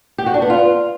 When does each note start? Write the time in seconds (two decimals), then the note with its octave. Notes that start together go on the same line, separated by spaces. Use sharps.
0.18 G4
0.26 F#4
0.34 D4
0.42 B3
0.50 F4